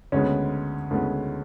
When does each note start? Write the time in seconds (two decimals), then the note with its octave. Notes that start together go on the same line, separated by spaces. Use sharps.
0.12 D2 C#3 G#3 B3 C#4
0.91 D2 C#3 G#3 B3